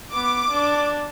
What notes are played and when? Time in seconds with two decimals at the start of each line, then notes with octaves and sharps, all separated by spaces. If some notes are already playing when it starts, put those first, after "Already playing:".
0.13 B3 D6
0.50 D4